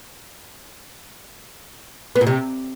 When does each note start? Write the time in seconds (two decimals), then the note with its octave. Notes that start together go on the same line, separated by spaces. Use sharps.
2.16 B3
2.21 A#2
2.27 C3